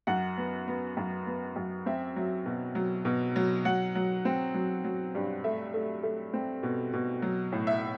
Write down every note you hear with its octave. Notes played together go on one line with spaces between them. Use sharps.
F#2 F#5
B3
B3
F#2
B3
F#2
C4 E5
F#3
B2
F#3
B2
F#3
F#3 F#5
F#3
C4
F#3
F#3
G2
A3 E5
A3
A3
C4
B2
B2
F#3
A2
E5